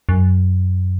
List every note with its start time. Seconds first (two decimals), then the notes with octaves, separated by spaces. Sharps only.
0.09 F#2